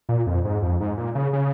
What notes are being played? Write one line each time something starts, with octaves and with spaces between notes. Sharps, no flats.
A#2
F2
G#2
F2
G#2
A#2
C#3
C#3